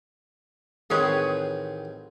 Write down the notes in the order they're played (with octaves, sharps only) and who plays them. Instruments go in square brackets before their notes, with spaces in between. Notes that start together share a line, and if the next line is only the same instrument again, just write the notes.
[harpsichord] A1 D#3 C4 [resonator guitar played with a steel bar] G#4 B4 C#5